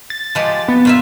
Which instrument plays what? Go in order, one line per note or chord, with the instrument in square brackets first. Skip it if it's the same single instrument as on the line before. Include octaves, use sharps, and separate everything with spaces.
[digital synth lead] A6
[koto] F3 G#3 G4
[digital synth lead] B3
[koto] A#2 F4 E5